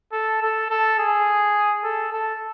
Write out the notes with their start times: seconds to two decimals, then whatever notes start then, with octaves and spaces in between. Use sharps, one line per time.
0.12 A4
0.41 A4
0.70 A4
0.99 G#4
1.84 A4
2.12 A4